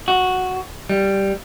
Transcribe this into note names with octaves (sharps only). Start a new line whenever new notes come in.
F#4
G3